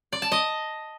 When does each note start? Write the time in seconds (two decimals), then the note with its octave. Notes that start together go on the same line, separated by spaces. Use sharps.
0.13 D5
0.22 A5
0.32 D#5